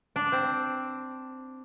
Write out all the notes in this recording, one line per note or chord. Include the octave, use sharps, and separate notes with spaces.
D4
C4